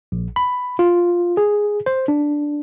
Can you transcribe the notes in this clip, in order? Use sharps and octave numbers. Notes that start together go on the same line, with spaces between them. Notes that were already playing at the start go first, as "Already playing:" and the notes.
A#1
B5
F4
G#4
C5
D4